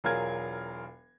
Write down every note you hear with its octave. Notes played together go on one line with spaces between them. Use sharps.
E1 F#3 F4 G#4 A#4 G#6